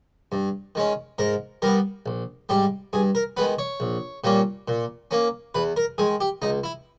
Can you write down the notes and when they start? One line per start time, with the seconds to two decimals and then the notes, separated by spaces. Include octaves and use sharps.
0.32 G2
0.75 D#3 G#3 C#4
1.18 G#2 A#4
1.62 G3 B3 A#4
2.06 A#1
2.49 G#2 G3 G4
2.93 G2 G#4
3.15 A#4
3.37 D#3 G#3 B3 B4
3.59 C#5
3.80 A#1
4.24 A#2 G3 A#3 C#4
4.68 A#2
5.11 A#3 C#4
5.55 E2 B4
5.77 A#4
5.98 D#3 G#3 G#4
6.21 G4
6.42 C#2 D#4
6.64 E4